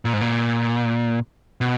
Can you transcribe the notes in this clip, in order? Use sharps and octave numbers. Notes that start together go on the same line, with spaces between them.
A#2
G#2
A#2
B2